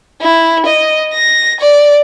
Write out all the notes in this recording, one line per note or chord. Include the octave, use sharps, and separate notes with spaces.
E4
D#5
A#6
D5